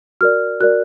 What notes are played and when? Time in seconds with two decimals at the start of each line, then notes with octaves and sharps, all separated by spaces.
0.21 F#4 A#4 D5 F6
0.60 F#4 A#4 D5 F#6